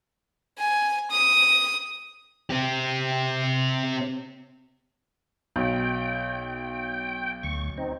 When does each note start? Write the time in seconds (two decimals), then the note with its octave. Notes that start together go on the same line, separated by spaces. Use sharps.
0.58 G#5
1.11 D#6
2.50 C4 G4
5.56 B1 G5
7.43 D2 C#6
7.78 C4 D#4